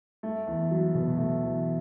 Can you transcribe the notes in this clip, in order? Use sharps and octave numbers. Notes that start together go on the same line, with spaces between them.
A3
E2
F#3
B2
A3
E2